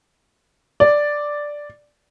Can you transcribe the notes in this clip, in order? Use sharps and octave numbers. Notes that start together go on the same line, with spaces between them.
D5